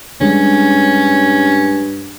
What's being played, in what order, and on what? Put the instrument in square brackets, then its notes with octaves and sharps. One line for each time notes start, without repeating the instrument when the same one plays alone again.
[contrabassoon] G2 [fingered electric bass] G3 G#3 D4 [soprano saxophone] C#4